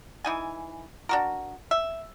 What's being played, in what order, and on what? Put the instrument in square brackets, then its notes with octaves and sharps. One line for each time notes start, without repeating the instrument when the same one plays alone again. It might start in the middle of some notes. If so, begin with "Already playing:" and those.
[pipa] E3 D#4 G#5
D4 F#4 A#4
E5